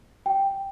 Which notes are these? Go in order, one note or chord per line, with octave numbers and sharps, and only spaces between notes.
G5